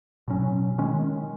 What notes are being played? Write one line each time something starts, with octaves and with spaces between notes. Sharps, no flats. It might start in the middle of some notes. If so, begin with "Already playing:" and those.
B2 F#3 C#4
D#3 G#3 C#4